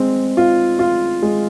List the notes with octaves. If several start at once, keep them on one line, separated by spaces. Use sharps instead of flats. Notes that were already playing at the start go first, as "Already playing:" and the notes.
Already playing: G#3 C4
F4
F4
G#3